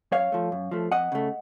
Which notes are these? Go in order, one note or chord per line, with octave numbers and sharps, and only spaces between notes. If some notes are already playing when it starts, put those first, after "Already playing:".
F#2 C#5 F5
F3 A3
F#2
F3 A3
F2 D#5 F#5
C#3 A3